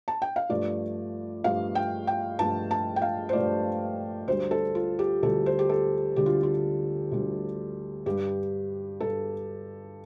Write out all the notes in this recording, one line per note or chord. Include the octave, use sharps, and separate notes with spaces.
A5
G5
F5
G2 F3 A3 D5
G2 F3 A3 F5
G5
G5
G2 F3 A3 A5
A5
G5
F5
C5
G2 F3 A3 D5
D2 D3 G3 C5
A4
F4
G4
D2 D3 G3 A4
C5
G4
A4
D2 D3 G3 G4
F4
F4
D2 D3 G3
G2 G3 G4
G2 G3 A4